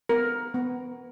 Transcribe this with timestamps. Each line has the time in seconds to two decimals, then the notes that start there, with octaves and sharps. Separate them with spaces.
0.09 B3 A#4
0.54 B3